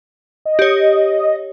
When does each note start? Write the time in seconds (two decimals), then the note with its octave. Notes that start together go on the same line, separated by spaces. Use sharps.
0.45 D#5
0.59 G4 C#5